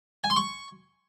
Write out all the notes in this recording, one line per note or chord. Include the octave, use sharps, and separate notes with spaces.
G#5
C6
C#6